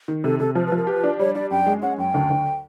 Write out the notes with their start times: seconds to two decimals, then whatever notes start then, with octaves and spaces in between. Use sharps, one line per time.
0.08 D#3
0.24 C3 A4
0.40 C3 A4
0.55 F3 C5
0.66 B4
0.72 F3
0.77 A#4
0.87 G4 B4
1.04 D4
1.19 G3 C#5
1.35 D4 D5
1.51 F#2 G5
1.66 G#3
1.82 C#4 F#5
1.98 F#2 G5
2.14 D2
2.30 D2